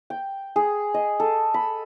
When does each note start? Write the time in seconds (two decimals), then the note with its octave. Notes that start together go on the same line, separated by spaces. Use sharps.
0.10 G5
0.56 G#4
0.94 D#5
1.20 A4
1.54 B5